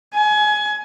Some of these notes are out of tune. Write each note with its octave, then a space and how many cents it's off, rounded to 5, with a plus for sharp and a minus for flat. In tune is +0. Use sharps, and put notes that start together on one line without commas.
G#5 +25